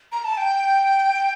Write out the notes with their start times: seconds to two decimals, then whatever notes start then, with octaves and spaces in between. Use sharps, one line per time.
0.12 A#5
0.24 A5
0.37 G5